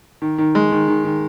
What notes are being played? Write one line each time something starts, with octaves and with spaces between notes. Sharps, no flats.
D#3
D#3
G#3
D#3
D#3
D#3